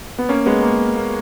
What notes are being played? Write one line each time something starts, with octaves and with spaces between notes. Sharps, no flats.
B3
A#3 C#4
G#3 B3
A#3
A#3